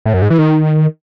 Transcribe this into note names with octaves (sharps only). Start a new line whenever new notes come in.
A2
F#2
G#2
E3
D#3